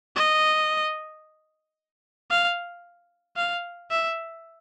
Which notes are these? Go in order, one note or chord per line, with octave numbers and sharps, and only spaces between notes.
D#5
F5
F5
E5